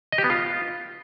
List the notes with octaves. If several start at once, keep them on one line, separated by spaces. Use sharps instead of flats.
D#5
G4
B3
F4